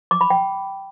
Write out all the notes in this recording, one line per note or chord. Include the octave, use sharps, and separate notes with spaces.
D6
B5
G5